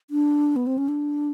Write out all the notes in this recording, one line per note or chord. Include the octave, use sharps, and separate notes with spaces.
D4
B3
C4
C#4
D4